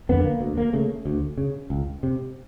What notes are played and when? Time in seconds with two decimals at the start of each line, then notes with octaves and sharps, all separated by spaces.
0.09 F2 D3 B3
0.24 A#3
0.40 D2
0.58 A#3
0.73 C#3 A3
1.05 D2
1.38 C#3
1.70 C#2
2.03 C3